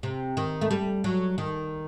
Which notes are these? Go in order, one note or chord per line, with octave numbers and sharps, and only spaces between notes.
C3
D#3
A3
G3
F#3
D#3